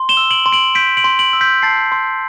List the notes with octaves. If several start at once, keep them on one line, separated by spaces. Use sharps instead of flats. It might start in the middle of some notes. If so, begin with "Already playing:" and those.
Already playing: C6
E7 G7
E6
D7 F#7
C6
D7 F#7
G6 B6 D7
D7 F#7
C6
D7 F#7
E6
G6 B6
A5 A6 C7
C6